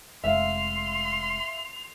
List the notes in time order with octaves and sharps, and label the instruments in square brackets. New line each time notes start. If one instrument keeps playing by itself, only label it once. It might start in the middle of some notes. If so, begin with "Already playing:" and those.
[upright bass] F1 G#3 [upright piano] E5 F5 [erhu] C6 [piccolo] F7